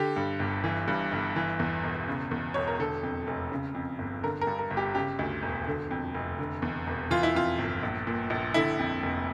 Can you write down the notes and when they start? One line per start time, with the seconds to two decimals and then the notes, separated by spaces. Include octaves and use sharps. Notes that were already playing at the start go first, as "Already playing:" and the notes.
Already playing: D3 G4
0.16 G2
0.39 G1
0.64 E3
0.88 G2
1.12 G1
1.36 E3
1.60 E2
1.84 E1
2.08 C#3
2.31 E2
2.54 E1 C#5
2.67 A#4
2.79 D3 A4
3.03 F2
3.27 F1
3.52 C#3
3.75 F2
3.99 G1
4.24 D3 A#4
4.41 A#4
4.47 G2
4.59 A#4
4.71 G1
4.77 G4
4.95 C#3 G4
5.19 D2
5.43 E1
5.67 D3
5.91 F2
6.14 F1
6.39 D3
6.62 E2
6.87 E1
7.11 E3 F4
7.23 E4
7.35 F2 F4
7.59 G1
7.83 A#1
8.07 A#2
8.30 A#1
8.54 D3 E4
8.79 F2
9.03 F1